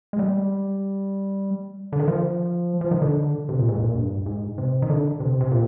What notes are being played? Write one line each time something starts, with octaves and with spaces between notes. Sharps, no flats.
G#3
G3
D3
D#3
F3
F3
D#3
D3
C3
A#2
G#2
A#2
G2
G#2
C3
D#3
D3
C3
C3
A#2